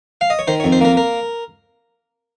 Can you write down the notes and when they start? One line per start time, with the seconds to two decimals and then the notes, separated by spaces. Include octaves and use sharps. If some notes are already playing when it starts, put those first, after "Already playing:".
0.21 F5
0.30 D#5
0.39 C#5
0.47 D#3 C5
0.60 C#5
0.64 F2
0.72 C5
0.81 A#3 A#4
0.97 A#4